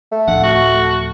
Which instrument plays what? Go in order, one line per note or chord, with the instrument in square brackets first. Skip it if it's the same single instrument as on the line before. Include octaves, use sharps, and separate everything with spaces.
[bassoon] A3
[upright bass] D1 F3 [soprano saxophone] F#5
[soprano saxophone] F#4